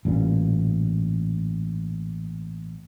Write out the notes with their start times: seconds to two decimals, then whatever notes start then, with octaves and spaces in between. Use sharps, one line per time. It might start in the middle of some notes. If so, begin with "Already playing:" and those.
0.05 A1 G2 A#2